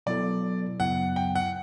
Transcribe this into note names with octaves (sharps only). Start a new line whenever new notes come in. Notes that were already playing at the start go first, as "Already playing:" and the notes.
B2 F#3 B3 E4 A4 D5
F#2 C#3 F#3 B3 E4 F#5
G5
F#5